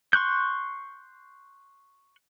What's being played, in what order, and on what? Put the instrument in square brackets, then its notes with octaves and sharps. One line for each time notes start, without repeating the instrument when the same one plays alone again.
[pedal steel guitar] C6 C#6 F#6 G6